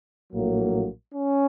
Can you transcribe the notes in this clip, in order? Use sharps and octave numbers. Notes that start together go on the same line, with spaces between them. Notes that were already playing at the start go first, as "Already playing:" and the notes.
A#1 A2 F#3 A#3
C#4